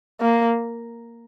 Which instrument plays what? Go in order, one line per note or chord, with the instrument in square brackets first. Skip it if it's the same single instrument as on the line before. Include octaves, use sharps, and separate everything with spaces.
[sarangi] A#3